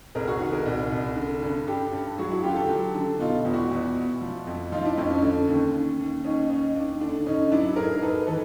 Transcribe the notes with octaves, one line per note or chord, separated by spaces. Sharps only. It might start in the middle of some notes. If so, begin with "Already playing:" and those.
C2 G#4 A#4
F#4 G#4
D#3 F#4 G#4
G#4 A#4
C2
C2
D3
G2
G2 G4 A4
G2
F#3 F#4 G#4
E4 F#4
D3 F4 G4
G4 A4
F#3
D3
B2 D#4 F4
E2
E4 F#4
E2
B2
F3
F2
F3 D#4 F4
D4 E4
F2 C#4 D#4
C#4
D3
D#2
D#2
D#2
D#2 C#4 D#4
D#2 C#4 D#4
D#2 D4
D3 D4
G#2 C#4 D#4
F#3 D4 E4
G#2 G#4 A#4
G#2 A4 B4
E3 A4 B4